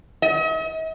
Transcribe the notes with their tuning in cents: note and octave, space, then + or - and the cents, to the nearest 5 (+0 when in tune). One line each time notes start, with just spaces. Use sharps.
D#5 +45